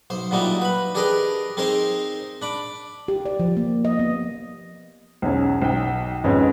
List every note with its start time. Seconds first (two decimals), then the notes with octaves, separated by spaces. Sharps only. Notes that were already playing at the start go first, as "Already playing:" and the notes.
0.10 B1 C5
0.31 A#2 F#3 G3 D#4 E4
0.61 B4 B5
0.95 D4 G4 G#4 A#4 B4 D#5
1.57 C4 D#4 G#4 A#4 C5
2.42 D4 B5 D6
3.08 G4
3.26 D5
3.40 F3
3.57 A#3
3.85 D#5
3.99 B3
5.22 B1 E2 C#4
5.62 B1 G5
6.24 F2 G#2 B3 C#4